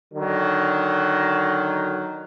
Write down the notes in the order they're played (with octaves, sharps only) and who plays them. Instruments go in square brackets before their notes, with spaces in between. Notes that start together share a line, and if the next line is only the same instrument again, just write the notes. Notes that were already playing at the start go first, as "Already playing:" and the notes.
[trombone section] D3 D#3 F#3